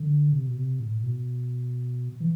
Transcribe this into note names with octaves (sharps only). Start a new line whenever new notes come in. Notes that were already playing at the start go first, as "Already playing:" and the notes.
Already playing: D3
C3
B2
C3
A2
B2
E3